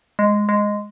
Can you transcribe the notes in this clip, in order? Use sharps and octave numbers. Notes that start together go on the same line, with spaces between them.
G#3
G#3